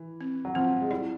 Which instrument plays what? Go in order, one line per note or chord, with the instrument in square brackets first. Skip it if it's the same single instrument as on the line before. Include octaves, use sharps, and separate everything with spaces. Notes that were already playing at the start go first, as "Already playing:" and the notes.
Already playing: [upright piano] E3
[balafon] C4
[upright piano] F#3
[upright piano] F3 [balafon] C4
[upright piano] G#3
[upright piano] G3 [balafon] E4